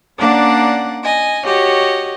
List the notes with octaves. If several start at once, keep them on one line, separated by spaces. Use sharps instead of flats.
A#3 C#4 D4 D5 F#5
D#5 G#5
F#4 G4 C#5 D#5